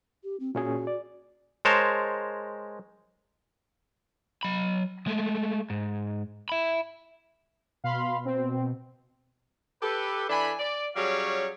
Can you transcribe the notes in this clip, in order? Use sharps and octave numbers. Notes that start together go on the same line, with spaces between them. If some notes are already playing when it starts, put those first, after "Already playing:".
G4
C4
A#2 C#4 F#4 G#4
D5
G#3 A#4 C5 C#5 A5
F#3 B5
G#3 A3
G#2
E5 B5
B2 F5 B5 C6
C4
G4 A4 B4
E3 D4 A4 G#5 B5
D5
F#3 G3 C#4 G#4 C#5 F5